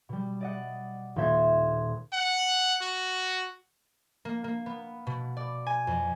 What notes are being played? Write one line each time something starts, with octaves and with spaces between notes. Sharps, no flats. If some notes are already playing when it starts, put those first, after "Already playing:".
B2 G3
D5 D#5 F#5
D#1 A#2 C5 E5 G#6
F#5
F#4
A#3
A#3
B3
B2
D5
G#5
F2